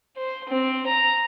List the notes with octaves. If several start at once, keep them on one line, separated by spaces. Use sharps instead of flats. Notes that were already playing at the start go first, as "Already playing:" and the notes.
C5
C4
A#5